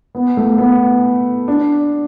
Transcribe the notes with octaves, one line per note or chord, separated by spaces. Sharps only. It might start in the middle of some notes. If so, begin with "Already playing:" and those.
B3
A3
B3
D4